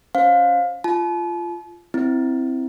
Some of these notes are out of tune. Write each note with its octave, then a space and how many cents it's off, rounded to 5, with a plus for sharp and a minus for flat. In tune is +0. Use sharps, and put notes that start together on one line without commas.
C#4 +0 C5 +5 F5 +20
F4 -15 A5 -40
C4 +0 E4 +0